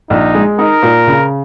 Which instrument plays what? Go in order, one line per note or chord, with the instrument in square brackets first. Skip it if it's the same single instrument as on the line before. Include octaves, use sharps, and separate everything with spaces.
[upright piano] A#1 [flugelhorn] D#4
[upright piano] G#3
[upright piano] D#4 [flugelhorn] A#4
[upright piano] A#2
C#3